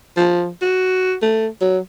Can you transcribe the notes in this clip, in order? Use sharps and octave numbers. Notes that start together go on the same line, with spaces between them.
F3
F#4
A3
F#3